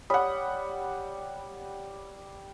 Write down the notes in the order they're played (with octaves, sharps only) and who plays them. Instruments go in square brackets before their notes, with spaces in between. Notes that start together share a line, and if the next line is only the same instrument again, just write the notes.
[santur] G3 [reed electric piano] C#5 D#6 [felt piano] F#5 B5